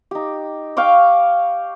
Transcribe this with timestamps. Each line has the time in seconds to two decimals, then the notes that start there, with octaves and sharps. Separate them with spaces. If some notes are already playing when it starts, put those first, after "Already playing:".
0.11 D#4 G4
0.77 F5 G5 C#6 D6